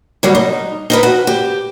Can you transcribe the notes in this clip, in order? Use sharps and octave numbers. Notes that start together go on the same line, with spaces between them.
D3 F#3 G3
D#4
D#4 A#4 B4
F#4
G4